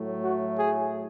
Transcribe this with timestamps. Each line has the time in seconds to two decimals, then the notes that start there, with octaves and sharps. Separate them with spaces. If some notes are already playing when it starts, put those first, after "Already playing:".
Already playing: A2 F#3 A3
0.23 F#4
0.58 G#4